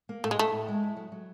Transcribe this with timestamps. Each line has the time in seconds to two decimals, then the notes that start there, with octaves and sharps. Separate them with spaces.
0.09 A#3
0.24 A2 A3
0.31 G#3
0.39 A2 A3
0.52 A2
0.68 G#3
0.83 E4
0.97 F#3
1.12 F#3